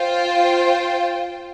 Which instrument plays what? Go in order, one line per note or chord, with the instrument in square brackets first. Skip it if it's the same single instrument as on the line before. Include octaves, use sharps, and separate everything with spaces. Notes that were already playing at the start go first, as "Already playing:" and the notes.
Already playing: [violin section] F4 C5 G5